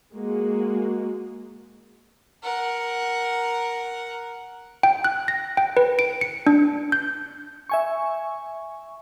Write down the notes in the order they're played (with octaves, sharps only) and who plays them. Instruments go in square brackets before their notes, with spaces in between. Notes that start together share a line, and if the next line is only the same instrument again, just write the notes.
[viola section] G#3 A#3 F#4
[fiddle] A#4 F#5
[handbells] G5
F#6
A#6
G5
B4
D7
C#7
D4
G6
[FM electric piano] E5 G#5 C#6